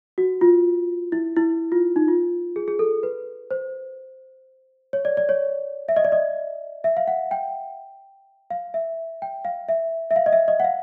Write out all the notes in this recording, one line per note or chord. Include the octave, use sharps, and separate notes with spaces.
F#4
F4
E4
E4
F4
D#4
F4
G#4
G#4
A4
B4
C5
C#5
D5
D5
C#5
E5
D#5
D5
D#5
E5
F5
F#5
G5
F5
E5
G5
F5
E5
E5
F5
D#5
E5
D#5
F#5
F5